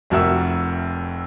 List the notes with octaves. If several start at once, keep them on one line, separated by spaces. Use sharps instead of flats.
F1 F2 F#4 A#4 E5 E6